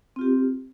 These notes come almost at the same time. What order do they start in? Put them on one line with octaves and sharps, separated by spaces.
C4 F4 G4